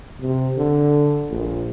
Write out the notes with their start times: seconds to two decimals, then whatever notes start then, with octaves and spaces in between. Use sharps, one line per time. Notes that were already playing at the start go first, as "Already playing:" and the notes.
0.22 C3
0.57 D3
1.30 A#1